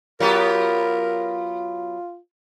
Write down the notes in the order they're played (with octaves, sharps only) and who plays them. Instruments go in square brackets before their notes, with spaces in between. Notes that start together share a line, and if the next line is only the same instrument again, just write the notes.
[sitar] F#3 B3 G4 [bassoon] F4 [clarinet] A#4